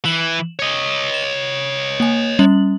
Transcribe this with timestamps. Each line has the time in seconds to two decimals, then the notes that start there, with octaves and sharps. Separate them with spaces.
0.05 E3 E7 F#7
0.59 C#5 D#5
1.14 E7
2.00 A#3 G#5
2.39 G3 C#4 F#7